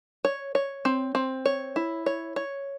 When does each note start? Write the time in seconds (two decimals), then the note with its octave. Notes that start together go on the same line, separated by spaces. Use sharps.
0.25 C#5
0.55 C#5
0.85 C4
1.15 C4
1.46 C#5
1.76 E4
2.06 C#5
2.36 C#5